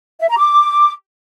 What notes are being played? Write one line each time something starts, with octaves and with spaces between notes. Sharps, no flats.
E5
A#5
D6